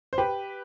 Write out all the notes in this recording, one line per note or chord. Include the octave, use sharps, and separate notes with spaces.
C5
G4 B4